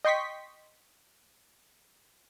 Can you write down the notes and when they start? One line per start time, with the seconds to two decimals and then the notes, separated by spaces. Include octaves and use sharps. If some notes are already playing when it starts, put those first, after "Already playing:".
0.05 D#5 G5 C6 C#6 B6